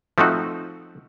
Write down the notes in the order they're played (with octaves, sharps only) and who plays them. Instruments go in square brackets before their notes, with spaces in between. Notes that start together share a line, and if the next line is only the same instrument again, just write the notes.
[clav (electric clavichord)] F3 A3 C4 D#4 F#4